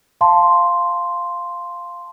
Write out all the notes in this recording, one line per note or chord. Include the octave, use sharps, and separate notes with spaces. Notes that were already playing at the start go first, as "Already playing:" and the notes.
F5 A5 C6